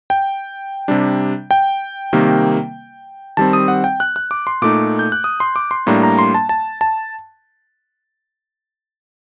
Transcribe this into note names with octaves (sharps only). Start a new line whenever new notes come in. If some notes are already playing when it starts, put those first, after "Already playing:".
G5
C3 G3 D4
G5
C3 D#3 G3 A#3
D#3 G3 C4 A5
D#6
F#5
G5
F#6
F#6
D6
C6
A#2 A3 D#4 D6
G6
F#6
D#6
C6
D6
C6
A2 G3 A#3 D4 A#5
A#5
C6
A5
A5
A5